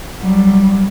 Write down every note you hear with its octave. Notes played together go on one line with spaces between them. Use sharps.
F#3 G3